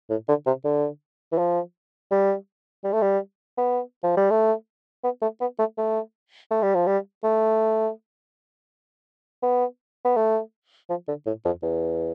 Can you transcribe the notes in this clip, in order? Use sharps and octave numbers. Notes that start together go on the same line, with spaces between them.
A2
D3
C3
D3
E3
F3
G3
G3
A3
G3
B3
F3
G3
A3
B3
A3
B3
A3
A3
A3
G3
F3
G3
A3
B3
B3
A3
F3
D3
A2
F2
E2